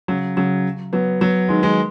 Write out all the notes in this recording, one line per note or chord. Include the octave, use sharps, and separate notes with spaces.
C#3 F#3
C#3 F#3
F#3 B3
F#3 B3
D#3 G#3
D#3 G#3